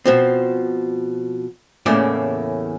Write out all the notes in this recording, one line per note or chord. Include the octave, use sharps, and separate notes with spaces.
B2 F3 C4
E2 A2 C#3 A3 A#3 D5